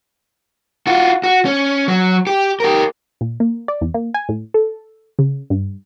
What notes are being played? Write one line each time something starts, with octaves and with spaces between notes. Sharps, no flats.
F4 F#4
F#4
C#4
F#3
G4
G4 A#4
A#2
A#3
D5
E2
A#3
G#5
A2
A4
C#3
G2